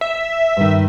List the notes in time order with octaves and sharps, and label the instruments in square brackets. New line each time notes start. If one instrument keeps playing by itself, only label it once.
[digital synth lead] E5
[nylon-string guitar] G2 D#3